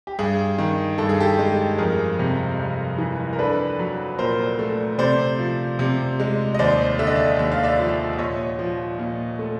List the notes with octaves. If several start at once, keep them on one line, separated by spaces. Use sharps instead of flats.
G4
G2 G#4
D#3
G2 A4
G#4
G4 A4
G#3
F2 G#4 A#4
C3
F2
E3
A#4
D4 A4 B4
F#3
A#2 A#4 C5
A3
C3 C5 D5
F3
C3
G#3
D#5
D#2 C5 D5
D3 E5
D#5
D5 E5
D#2 E5
F5
D5 E5
F3
E5
A#2 C#5 D#5
F3
A#2
A3